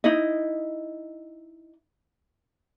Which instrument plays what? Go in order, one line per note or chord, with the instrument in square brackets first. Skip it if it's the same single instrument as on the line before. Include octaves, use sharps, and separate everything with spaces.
[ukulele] D#4 E4 D#5